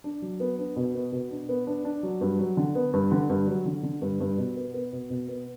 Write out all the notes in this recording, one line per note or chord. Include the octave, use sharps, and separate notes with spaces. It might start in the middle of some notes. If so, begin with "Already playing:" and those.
D4
F#3
B3
D4
B2
B3
B2
D4
B3
D4
D4
F#3
G2
F#3
D3
B3
G2
D3
G2
F#3
D3
D3
G2
G2
B2
B3
B3
B2
B2
B3